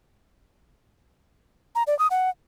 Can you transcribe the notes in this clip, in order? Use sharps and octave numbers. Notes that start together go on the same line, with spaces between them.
A#5
D5
D#6
F#5